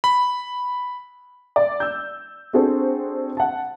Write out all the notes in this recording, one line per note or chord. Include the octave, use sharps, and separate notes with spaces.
B5
D5
E6 G6
C4 D4 F#4 G#4 A4 C5
F#5 A5